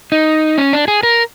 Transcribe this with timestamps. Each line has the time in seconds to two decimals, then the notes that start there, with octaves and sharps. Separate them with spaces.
0.12 D#4
0.58 C#4
0.73 D4
0.88 G#4
1.03 A#4